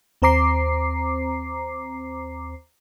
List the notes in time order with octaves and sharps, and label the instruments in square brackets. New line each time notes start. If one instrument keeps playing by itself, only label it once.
[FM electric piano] D#2 C4 C5 A#5 D6 C7